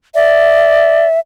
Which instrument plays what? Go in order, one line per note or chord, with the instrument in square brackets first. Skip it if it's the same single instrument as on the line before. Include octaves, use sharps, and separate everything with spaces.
[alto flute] D5 [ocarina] E5